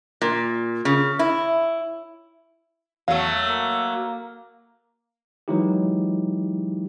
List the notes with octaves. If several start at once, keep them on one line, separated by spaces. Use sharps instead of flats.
A#2
C#3
E4
E2 F#3 A3 F5
A#3
E3 F#3 G#3 D#4 E4 G4